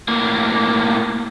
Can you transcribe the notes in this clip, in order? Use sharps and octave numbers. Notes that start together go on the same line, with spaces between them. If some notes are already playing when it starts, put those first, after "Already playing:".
A2 A#3